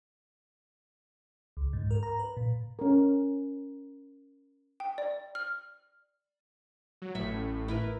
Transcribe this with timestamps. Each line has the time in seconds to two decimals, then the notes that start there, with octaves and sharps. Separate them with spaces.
1.57 C#2
1.73 G#2
1.91 A#4
2.03 A#5
2.19 B4
2.37 A#2
2.79 C#4 A#4
4.80 G5
4.98 D5
5.35 F6
7.02 F#3
7.15 A1 A2 E5 B5 C#6
7.68 E4 A#4 B4